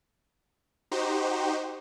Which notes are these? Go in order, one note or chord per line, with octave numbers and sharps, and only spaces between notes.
D#4 F#4 G4 C5